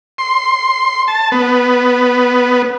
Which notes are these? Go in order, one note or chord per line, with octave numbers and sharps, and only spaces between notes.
C6
A5
B3